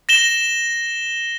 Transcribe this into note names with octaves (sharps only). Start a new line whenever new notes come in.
A#6 E7 G7